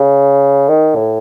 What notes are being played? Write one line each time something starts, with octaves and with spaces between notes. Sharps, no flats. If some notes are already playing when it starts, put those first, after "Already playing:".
Already playing: C#3
D#3
A2